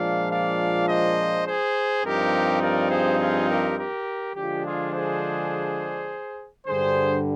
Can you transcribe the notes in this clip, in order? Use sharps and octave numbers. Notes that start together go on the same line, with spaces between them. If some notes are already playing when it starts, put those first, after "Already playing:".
Already playing: A#2 F3 G#3 D4 D5 F5
D5 F5
C5 D#5
G#4 C5
G2 F3 C4 D#4 G4 A#4
A#4 D5
G#4 C5
F4 G#4
G4 A#4
G4 A#4
D3 F3 G#3 D4 F4 G4
F4 G#4
G#4 C5
G2 D3 G3 G#4 C5